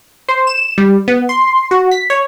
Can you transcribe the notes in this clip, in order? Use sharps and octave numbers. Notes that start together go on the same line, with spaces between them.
C5
E7
G3
B3
C6
F#4
B6
C#5